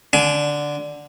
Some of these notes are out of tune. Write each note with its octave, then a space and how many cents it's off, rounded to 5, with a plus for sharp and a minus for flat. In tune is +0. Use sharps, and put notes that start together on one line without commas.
D3 +0 G#5 +30